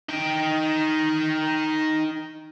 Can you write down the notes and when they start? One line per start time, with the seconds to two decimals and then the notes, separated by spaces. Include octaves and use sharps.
0.09 D#4 G5